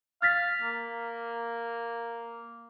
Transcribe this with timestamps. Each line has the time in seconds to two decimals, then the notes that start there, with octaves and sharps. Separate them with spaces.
0.22 F5 F6 A6 B6
0.62 A#3